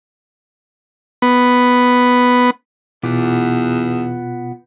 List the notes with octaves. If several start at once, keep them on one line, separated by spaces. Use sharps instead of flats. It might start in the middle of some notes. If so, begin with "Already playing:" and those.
B3
E2 B2 B3 F4 D6